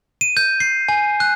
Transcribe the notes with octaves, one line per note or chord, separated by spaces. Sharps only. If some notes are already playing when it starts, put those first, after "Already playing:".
D#7
G6
C7
G#5
F#6